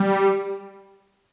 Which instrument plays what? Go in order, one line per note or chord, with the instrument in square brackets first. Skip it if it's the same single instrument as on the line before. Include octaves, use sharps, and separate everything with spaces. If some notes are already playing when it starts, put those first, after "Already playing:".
Already playing: [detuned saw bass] G3